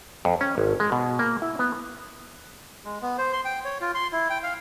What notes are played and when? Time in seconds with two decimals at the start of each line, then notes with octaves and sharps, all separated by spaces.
0.25 F2
0.41 C#4
0.58 G#1
0.80 G#3
0.92 B2
1.19 A#3
1.42 E4
1.59 B3
2.85 G#3
3.02 B3
3.18 C5
3.33 C6
3.45 G5
3.65 C#5
3.81 F4
3.94 C6
4.12 E4
4.30 G5
4.43 F5